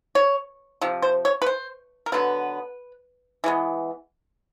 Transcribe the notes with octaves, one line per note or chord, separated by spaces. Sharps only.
C#5
C3 F3
C5
C#5
B4
C5
A#4
D3 F#3 B3 B4
E3 G#3 B3